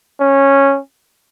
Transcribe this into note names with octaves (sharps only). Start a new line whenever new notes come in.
C#4